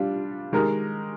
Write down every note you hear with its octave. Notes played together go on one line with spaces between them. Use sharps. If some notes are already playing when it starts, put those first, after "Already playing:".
Already playing: G3 D4 F4
D#3 G#3 D#4 G4 A#4